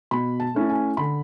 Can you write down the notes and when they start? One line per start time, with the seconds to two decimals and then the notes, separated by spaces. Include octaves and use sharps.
0.11 B2 B5
0.40 A5
0.55 A3 C#4 E4
0.70 G#5
0.97 D3 B5